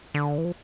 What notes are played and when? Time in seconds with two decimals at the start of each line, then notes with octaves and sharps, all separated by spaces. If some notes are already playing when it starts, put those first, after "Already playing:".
0.14 D3
0.38 E3
0.45 F3